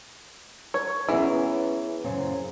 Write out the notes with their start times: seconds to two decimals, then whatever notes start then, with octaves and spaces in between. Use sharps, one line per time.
0.74 C#5
1.09 E3 F#3 B3 C#4 G#4
2.04 F#2 C#3 C4